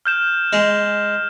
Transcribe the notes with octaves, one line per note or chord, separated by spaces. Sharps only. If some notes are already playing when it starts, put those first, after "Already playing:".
F6 G6 E7
G#3